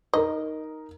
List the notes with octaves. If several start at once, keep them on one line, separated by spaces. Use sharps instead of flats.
D#4 A#4 D#5